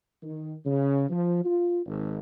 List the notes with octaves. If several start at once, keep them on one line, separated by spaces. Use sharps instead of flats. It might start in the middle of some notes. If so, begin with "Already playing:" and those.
D#3
C#3
F3
F4
G#1